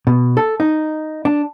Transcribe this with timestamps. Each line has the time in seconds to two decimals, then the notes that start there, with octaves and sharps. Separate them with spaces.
0.07 B2
0.37 A4
0.60 D#4
1.25 D4